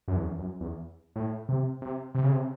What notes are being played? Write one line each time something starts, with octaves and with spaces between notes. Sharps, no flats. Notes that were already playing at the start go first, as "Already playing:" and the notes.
F#2
E2
F#2
E2
A2
C3
C3
C3
C#3
C3